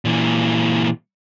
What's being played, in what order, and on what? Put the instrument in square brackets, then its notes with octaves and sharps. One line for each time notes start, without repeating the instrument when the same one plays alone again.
[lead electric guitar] A#2 E3